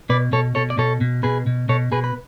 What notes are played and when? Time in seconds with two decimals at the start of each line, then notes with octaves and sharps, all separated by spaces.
0.09 B2 B4 D5
0.32 B2 A4 C#5
0.55 B2 A4 C#5
0.70 D5
0.78 B2 A4 C#5
1.01 B2
1.23 B2 G#4 B4
1.47 B2
1.69 B2 A4 C#5
1.92 B2 G#4 B4
2.04 B4